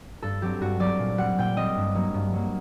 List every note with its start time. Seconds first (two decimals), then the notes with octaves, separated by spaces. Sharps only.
0.22 G2 A4
0.42 F#3 C4 G4
0.61 G2 F#4
0.80 F#3 C4 D5
0.99 A#2
1.18 G3 C4 F#5
1.38 A#2 G5
1.56 G3 C4 D#5
1.77 G2
1.95 F#3 A#3
2.14 G2
2.33 F#3 A#3